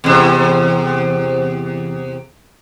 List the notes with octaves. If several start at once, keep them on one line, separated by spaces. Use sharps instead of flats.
E2 C3